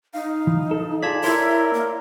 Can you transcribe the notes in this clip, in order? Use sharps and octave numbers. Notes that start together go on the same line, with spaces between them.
D#4 F5
E3
A4
F4 G#4 D5 A5 G#6 B6
E4 A#4 C#5 D5 C6 G#6
A#3